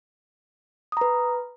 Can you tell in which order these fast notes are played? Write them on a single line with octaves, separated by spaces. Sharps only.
D#6 A#5 B4